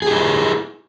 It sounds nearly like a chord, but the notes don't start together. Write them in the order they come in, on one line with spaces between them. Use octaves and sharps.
G#4 G4 E4